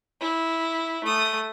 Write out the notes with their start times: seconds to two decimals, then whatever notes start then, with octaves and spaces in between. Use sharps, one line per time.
0.21 E4
1.04 A3 D#6